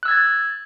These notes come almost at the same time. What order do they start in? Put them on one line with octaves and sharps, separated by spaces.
F#6 E6 G#6 A6